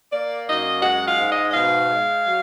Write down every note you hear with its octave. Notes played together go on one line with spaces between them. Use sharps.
A#3 D5
F#2 D#5
G#3 F#5
F5
G#2
D#5
D#5
B2 F5
G#3
F#3